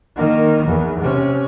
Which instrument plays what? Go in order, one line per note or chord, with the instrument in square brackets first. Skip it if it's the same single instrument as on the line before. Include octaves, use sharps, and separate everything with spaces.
[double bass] D#3 A#3
E2
C3 C#4